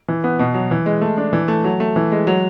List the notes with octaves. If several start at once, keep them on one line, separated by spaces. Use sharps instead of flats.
E3
B3
B2
F#3
E3
G#3
A3
D4
E3
A3
F#3
A3
E3
G#3
F#3